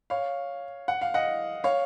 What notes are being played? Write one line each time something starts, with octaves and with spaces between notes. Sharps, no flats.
C#5 F5
F#5
F5
D#5 F#5
C#5 F5